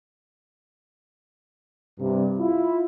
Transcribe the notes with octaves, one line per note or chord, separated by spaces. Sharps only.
G2 C3 G3
E4 F4